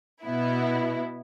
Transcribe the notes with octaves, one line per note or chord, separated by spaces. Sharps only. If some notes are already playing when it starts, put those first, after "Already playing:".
B2 B3 E4